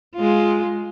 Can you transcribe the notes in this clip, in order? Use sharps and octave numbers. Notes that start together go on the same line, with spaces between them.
G#3 F4